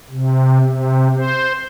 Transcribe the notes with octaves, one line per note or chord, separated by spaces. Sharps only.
C3
C3
C5